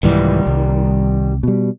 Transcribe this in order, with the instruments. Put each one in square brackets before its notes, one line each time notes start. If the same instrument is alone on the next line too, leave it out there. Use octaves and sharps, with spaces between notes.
[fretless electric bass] C2 G#2 E3 [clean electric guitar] D#3 G3
[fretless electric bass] C2
B2 G3